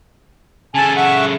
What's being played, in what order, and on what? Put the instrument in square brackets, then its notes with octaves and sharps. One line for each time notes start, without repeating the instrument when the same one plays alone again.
[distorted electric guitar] C#3 A4 [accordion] G#5 A5
[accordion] E5 F#5 C#6